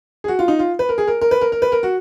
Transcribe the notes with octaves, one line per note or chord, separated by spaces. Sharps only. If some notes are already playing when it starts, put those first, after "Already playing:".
G#4
F#4
F4
D#4
F4
B4
A#4
G#4
A#4
A#4
B4
A#4
A#4
B4
A#4
F#4